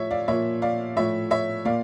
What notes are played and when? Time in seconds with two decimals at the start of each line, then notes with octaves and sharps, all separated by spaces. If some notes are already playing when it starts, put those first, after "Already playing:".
Already playing: A2 F3 C#5 E5
0.11 D5 F5
0.28 A#2 F3 C#5 E5
0.62 D5 F5
0.96 A2 F3 C#5 E5
1.31 C#5 E5
1.65 A#2 D5 F5